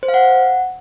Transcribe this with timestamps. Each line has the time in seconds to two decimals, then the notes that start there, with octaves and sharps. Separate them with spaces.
0.03 C5
0.08 F5
0.14 F#5